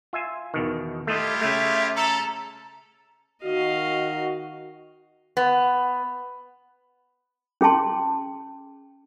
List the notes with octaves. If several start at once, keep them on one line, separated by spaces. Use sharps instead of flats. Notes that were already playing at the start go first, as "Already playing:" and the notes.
F4 E5 G#5
E2 B2 D#3
A3 E4 F4 G4 D#5
C#3 A3 E5
A4 A#5
D#3 F#4 D#5 F5
B3
C#4 G#4 G5 A5 C6